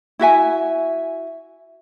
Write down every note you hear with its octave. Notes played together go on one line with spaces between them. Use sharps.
E4 F#4 E5 G#5